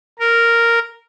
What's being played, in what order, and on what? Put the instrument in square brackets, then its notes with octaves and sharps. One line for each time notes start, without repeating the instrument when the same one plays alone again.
[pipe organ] A#4